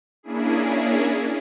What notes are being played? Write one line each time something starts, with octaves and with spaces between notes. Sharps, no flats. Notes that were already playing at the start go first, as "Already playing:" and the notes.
A#3 C#4 D4 E4 G#4